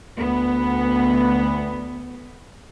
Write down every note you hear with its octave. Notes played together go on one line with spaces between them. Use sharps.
D2 B3